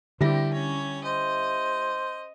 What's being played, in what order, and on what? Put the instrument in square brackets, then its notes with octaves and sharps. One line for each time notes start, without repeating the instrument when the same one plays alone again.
[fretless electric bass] D3 [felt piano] G3 E4 A#6 [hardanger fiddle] C4 G4
[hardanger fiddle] C#4 C#5
[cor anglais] C5 [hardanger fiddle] D#5